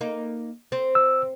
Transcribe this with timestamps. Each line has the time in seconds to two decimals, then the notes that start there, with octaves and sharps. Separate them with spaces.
0.01 A#3 D#4
0.72 C4
0.95 E6